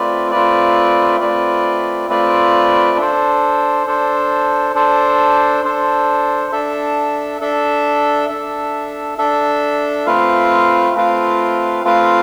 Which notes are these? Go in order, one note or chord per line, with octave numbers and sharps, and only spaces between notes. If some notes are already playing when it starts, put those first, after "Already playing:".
Already playing: A3 C4 F4 B4 D5
A3 C4 F4 B4 D5
A3 C4 F4 B4 D5
A3 C4 F4 B4 D5
D4 A4 C5
D4 A4 C5
D4 A4 C5
D4 A4 C5
D4 A4 E5
D4 A4 E5
D4 A4 E5
D4 A4 E5
A3 C4 F4 B4 F5
A3 C4 F4 B4 F5
A3 C4 F4 B4 F5